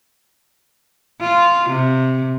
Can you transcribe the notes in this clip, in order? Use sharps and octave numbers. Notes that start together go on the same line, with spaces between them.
F4
C3